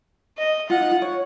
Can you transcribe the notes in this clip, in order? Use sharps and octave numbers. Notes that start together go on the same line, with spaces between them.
D#5
F4 F#5
D#4
F4
C#5